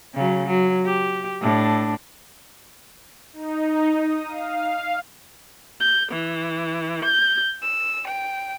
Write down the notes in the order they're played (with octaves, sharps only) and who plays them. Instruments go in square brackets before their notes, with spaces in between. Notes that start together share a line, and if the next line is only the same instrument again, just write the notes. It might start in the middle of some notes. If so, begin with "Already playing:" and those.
[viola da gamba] C#3 F#3
F#3
G4
A2 D4
[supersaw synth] D#4
D#6
F5
[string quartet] G6
E3
G6
E6
G5